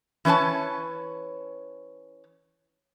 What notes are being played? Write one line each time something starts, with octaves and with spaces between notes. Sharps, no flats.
E3 C#4 B4 C#5 A5